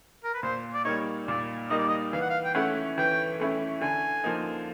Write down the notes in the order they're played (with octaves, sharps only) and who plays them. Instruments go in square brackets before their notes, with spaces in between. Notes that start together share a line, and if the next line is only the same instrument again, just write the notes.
[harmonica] A#4
B4
[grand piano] A#2 [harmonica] C5
[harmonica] D5
[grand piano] G3 A#3 D#4 [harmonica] C#5
[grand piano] A#2 [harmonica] D5
[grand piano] G3 A#3 D#4 [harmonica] D#5
[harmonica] D5
D#5
[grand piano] E3 [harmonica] F5
[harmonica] F#5
F5
G5
[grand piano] A3 C#4 E4 [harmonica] F#5
[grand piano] E3 [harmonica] G5
[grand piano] A3 C#4 E4
[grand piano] D3 [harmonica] G#5
[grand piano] F3 A#3 D#4